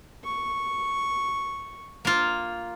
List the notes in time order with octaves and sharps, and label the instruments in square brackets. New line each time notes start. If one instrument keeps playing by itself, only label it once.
[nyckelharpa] C#6
[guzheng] A#3 F4